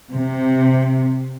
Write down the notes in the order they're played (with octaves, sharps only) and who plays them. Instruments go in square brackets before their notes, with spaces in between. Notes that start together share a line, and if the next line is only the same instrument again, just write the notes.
[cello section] C3